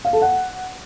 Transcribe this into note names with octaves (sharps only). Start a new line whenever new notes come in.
F5
A4
F#5